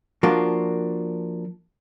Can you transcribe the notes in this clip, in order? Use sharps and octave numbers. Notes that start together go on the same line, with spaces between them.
F3 A#3 D4 F4 F#4